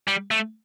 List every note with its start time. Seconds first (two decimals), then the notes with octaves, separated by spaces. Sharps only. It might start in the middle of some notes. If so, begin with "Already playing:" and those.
0.08 G3
0.31 A3